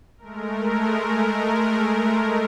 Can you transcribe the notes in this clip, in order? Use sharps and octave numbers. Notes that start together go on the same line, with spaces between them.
G#3 A3 A#4